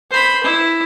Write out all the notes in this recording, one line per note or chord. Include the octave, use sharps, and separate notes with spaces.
C5 B5
E4